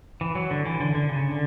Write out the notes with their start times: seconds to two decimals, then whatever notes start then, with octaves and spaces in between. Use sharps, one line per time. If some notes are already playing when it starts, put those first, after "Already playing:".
0.21 E3
0.35 F#3
0.51 D3
0.65 E3
0.80 D3
0.95 D3
1.09 C#3
1.31 D3